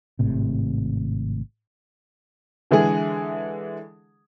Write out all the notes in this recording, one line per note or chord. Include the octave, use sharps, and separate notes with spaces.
G#1 A2 C3
D3 E3 G#3 G#4